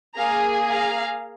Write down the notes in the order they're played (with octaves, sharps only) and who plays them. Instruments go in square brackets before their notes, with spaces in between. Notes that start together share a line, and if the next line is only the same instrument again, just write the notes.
[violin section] A#3 G#4 F5 A#5
F5 A#5